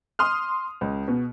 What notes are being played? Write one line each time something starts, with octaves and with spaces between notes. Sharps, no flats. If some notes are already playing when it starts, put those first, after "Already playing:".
C6 D#6 F6
C#2
B2